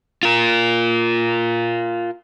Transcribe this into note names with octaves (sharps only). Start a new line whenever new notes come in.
F4 A#4